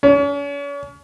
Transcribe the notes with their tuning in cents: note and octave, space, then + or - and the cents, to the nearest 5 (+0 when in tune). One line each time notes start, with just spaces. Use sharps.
C#4 +40